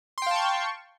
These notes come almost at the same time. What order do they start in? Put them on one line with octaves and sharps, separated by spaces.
C6 G5 F5 A5 C#6